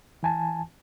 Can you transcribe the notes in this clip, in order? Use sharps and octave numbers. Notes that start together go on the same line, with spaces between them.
E3 G#5 A5